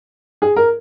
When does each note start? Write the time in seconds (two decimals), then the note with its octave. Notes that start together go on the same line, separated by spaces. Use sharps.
0.42 G#4
0.56 A#4